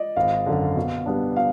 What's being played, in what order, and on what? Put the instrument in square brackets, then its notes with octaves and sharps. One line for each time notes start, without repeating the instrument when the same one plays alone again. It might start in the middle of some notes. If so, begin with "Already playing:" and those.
Already playing: [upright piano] D5 D#5
[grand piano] G#1 [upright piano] F5
[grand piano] F#2 D3
B2
G3 B3 D4
[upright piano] F5